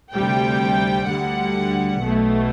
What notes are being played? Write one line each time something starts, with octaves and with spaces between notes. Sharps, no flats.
D2 C3 G3 G5
D2 D3 G3 F#5
B1 B2 A3